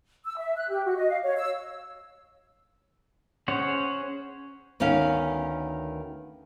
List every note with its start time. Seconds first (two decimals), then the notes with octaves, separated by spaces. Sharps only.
0.25 E6
0.38 E5
0.56 F#6
0.69 G4
0.85 F#4
0.97 D#5
1.09 F5
1.23 C#5
1.37 E6
3.48 C#4 G#4 C5 C#5 F#5
4.80 D2 D#3 B3 C#4 F5